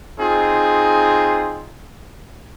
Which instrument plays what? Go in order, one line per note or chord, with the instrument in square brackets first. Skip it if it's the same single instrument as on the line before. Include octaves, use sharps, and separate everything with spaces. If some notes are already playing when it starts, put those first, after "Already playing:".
[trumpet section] C4 D#4 F4 G#4